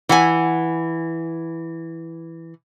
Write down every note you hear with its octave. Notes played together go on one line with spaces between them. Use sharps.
E3 F#5 G#5